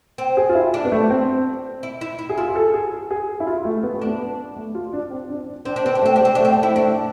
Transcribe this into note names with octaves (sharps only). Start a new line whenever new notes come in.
C4
G#4
F4
E4
D4
B3
A3
C4
E4
E4
E4
G#4
E4 F4
G#4
A4
G#4
G#4
E4
F4
A3
B3
A3
B3 D4
A3
F4
D4
C4
D4
D4
C4 D4
D4
B3 C4
D4
A3
C4
D4
G#3
C4
A3 D4
C4
A3
E4
A3 D4